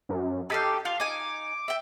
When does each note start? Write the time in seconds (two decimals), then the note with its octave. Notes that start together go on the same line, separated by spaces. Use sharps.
0.09 F#2
0.50 D#4 G4 A4 F5
0.85 F4 F5
1.00 D#4 G#5 D6
1.68 E5 G5